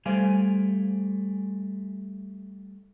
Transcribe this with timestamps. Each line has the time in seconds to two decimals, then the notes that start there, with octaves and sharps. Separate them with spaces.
0.06 G3 A3 C5 D5 F5 G#5